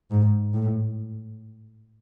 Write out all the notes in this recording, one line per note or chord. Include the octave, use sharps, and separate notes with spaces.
G#2
A2